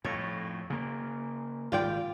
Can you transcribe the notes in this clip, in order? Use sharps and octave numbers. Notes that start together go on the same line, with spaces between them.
F2 A2 C#5
C#3 A#3
G#1 F4 D5 G5